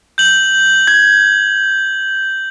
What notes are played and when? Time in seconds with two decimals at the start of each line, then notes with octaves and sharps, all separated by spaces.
0.18 G6 F#7
0.88 G#6